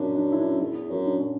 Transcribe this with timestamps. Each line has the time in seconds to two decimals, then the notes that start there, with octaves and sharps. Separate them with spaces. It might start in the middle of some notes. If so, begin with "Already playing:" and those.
Already playing: F#2 C#4 D4
0.16 D4
0.32 E4
0.38 D4
0.60 E2 E4
0.90 F#2
1.05 D4
1.20 C#4